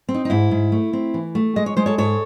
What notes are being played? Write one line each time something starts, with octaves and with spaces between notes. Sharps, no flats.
C4
D#4
D#4
G#2 E4
G#2
A3
C4
E3
A3
G#3 D#5
C#5
G#3 C5
A4 C#5
G#2 A4 C#5